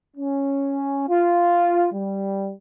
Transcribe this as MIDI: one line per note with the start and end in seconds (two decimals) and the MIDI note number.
0.17 1.05 61
1.09 1.88 65
1.93 2.51 55